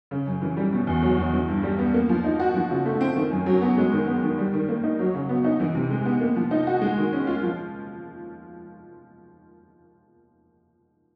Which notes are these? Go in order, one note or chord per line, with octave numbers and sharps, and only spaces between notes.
C#3
F#2
E3
G3
B2
E2
F#3
E2
E3
G2
G3
B3
A#3
F3
D#4
F#4
F3
C#3
A3
C4
D#3
F#2
F#3
B3
G#3
D#3
B3
D#3
G3
D#3
A#3
D#4
F#3
C#3
B3
D#4
E3
C3
G#3
B3
A#3
F3
D#4
F#4
G#3
D#3
C#4
F4
F3